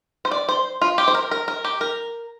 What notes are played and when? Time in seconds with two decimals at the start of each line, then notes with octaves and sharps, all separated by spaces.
0.25 C5
0.31 D5
0.49 C5
0.81 F4
0.98 G4
1.08 C5
1.14 A#4
1.31 A#4
1.48 A#4
1.65 G4
1.81 A#4